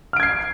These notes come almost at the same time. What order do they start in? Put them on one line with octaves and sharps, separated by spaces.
F6 D7 G#6 C7